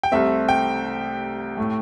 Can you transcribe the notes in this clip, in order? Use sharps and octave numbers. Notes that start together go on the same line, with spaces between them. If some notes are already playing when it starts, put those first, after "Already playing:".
G5
C2 C3 A3 C4 E5
G5
A2 A3